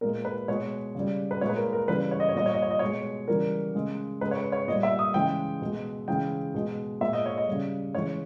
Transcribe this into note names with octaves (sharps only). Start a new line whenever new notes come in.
A#2 G#3 A#4
B4
B2 G#3 C#5
C#3 G3
B4
A#2 G#3 C#5
B4
A#4
A#4
C#3 E3 G3 B4
C#5
D#5
C#5
A#2 G3 D#5
C#5
D#5
C#5
D#5
B2 G#3 C#5
C#3 E3 G3 A#4
C#3 G#3
C#3 G#3 B4
C#5
B4
C#5
A#2 G3 D#5
E5
D#6
C#3 E3 G#3 G5
B2 G#3
C#3 E3 G#3 G5
B2 G#3
A#2 G#3 E5
D#5
C#5
D#5
C#3 G3
C#3 E3 G#3 C#5